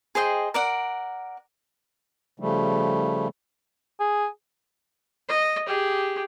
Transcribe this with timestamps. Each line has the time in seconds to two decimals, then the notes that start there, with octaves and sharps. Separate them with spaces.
0.15 G#4 C5 D#5 G5
0.54 A#4 D5 F#5
2.40 C#3 F3 G3 A3
4.00 G#4
5.28 D#5
5.67 G4 G#4